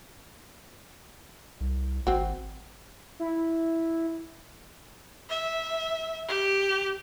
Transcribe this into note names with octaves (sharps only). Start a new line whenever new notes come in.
C2
G#1 C4 F#4
E4
E5
G4